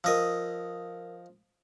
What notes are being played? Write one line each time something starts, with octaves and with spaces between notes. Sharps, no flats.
F3 A#4 D#5 D#6 E6